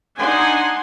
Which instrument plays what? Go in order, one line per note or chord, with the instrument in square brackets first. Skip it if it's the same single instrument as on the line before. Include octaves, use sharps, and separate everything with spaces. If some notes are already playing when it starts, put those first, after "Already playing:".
[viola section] D4 D#4 F#5 G#5 C6